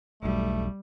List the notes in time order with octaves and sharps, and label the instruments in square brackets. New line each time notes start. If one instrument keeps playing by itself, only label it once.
[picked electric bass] E1 B1 [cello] G3 [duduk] A3